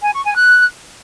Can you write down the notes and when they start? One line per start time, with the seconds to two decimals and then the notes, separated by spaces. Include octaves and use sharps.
0.02 G#5
0.13 C#6
0.24 G#5
0.36 F#6